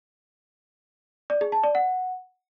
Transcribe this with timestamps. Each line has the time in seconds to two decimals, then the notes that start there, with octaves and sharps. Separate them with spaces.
1.30 D5
1.41 G#4
1.52 A5
1.64 D5
1.75 F#5